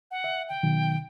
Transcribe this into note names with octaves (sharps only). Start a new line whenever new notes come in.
F#5
E5
G5
B2 D#3 F#3